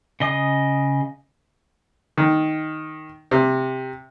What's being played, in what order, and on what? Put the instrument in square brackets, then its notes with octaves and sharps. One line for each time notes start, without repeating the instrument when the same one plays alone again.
[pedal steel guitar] C#3 D#5 D#6
[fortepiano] D#3
C3